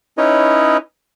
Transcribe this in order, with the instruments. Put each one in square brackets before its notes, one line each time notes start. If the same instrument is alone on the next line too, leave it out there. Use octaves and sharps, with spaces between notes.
[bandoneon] C#4 D#4 E4 B4 C#5 D#5